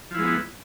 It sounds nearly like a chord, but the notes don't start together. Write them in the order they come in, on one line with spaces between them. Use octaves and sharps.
F3 E4 G#3 B3